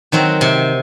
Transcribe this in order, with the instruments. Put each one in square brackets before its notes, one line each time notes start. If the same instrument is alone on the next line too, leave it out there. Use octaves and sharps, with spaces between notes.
[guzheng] D#3 F#3 C4
C3